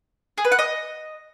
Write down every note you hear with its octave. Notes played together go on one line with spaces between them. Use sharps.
G#4
B4
F#5
D#5